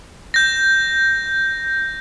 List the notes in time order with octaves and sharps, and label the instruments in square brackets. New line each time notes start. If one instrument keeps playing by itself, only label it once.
[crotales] G6 A#6